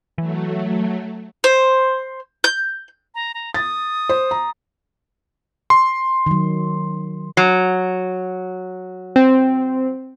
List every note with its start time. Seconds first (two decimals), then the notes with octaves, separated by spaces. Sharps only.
0.18 E3 F#3 A3
1.44 C5
2.44 G6
3.15 A#5
3.34 A#5
3.54 D#6 A6
4.09 C5
4.31 A#5
5.70 C6
6.26 D#3 F#3
7.37 F#3
9.16 C4